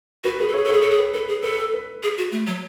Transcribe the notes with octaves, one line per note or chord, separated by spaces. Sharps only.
F#4 B4
G#4 B4
A4
G#4 C#5
A4
G#4 C#5
A4
G#4
B4
A4 B4
G#4
A4 B4
B4
G#4
F#4
A3
F#3